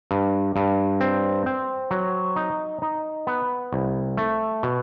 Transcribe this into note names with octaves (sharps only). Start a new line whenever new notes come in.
G2
G2
C4
C4
F#3
D#4
D#4
B3
C2
A3
B2